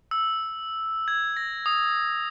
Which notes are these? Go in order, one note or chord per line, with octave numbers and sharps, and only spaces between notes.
E6
G#6
A#6
D#6